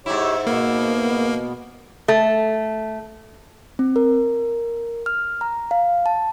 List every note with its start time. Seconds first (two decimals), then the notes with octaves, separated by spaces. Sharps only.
0.06 G#2 E4 G4 C#5
0.47 B2 A#3 B3
2.08 A3
3.79 C4
3.96 A#4
5.06 F6
5.41 A#5
5.71 F5
6.06 A5